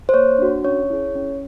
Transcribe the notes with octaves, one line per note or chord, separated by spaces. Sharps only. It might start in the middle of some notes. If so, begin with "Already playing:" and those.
C5
A#3 C#5
D4 F#4
C#4 C#5
E4 G#4
C#4